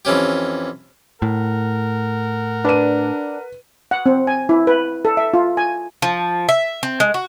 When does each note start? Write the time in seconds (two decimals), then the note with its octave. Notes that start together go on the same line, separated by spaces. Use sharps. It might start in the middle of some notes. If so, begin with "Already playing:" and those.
0.05 F2 E3 C#4 G4
1.22 A2 A#4 F#5
2.65 D4 B4 D#7
3.91 F#5
4.06 C4
4.27 G#5
4.49 E4
4.67 B4
5.05 A4
5.17 E5
5.34 F4
5.57 G#5
6.02 F3
6.49 E5
6.83 C4
7.00 G#3
7.14 F#4